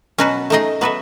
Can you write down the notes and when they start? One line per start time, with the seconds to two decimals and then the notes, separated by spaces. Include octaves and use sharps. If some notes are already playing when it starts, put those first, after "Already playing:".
0.18 B2 F#3 C#4 F#4 B4
0.50 A3 D#4 G#4 D#5
0.81 F#3 B3 F#4 B4 E5